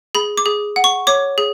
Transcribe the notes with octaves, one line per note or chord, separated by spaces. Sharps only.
G#4 B5
D6
G#4
F#5
C#6
C#5 D6
G#4